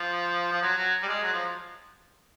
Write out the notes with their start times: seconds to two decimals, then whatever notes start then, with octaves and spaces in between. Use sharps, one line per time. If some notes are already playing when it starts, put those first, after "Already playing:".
Already playing: F3
0.52 F3
0.62 F#3
0.77 F#3
1.03 G3
1.08 G#3
1.23 F#3
1.33 F3